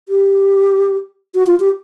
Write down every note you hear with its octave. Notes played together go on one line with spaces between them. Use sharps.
G4
F#4
F4
G4